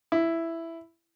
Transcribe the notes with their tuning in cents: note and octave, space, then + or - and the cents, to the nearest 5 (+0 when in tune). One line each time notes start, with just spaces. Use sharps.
E4 +5